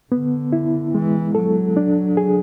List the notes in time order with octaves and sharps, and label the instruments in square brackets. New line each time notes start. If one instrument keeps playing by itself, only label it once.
[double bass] D3 [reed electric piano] B3
[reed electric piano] E4
[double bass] E3 [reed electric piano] G#3
[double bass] F#3 [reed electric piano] A4
[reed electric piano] D4
G#4